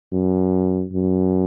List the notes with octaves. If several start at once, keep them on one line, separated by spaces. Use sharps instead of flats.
F#2
F#2